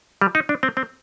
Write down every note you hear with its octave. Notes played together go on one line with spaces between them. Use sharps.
G3
D#4
D4
C4
C4